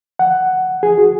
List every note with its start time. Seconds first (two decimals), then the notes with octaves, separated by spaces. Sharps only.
0.19 F#5
0.83 G#4
0.98 F#4